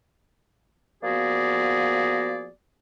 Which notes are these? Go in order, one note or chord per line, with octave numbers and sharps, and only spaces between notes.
F3 A#3 B3 F#4 G#4 D5